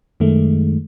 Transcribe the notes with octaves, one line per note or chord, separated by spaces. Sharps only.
F#2 D#3 G#3 A3